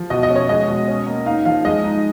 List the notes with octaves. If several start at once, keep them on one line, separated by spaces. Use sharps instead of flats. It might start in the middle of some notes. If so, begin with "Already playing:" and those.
Already playing: F3
B2 D#5
D#5
C#4
C#5
G#3 D#5
B2
C#4
A#3
D#4 F5
F3 F5
G#3 D#5
D#4